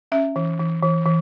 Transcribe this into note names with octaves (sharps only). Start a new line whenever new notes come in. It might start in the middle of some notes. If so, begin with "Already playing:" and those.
C#4 E5
E3
E3
E3
E3